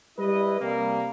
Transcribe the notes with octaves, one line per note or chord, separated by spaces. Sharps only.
G3 E4 B4 D#5
C3 G3 A#3